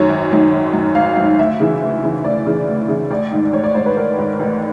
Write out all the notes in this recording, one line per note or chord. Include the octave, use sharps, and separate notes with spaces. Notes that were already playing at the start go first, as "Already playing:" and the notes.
Already playing: F#2 D#3 C#5
G#1
F#2 D#3
G#1
F#2 D#3
G#1 F5
F#2 D#3
D2 E5
C#3 E3
D2
C#3 E3
D2 D5
C#3 E3
D2
C#3 E3
A1 D5
G#2 D#3
A1 C#5
D5
G#2 D#3 C5
B4
A1 A#4
G#2 D#3
A1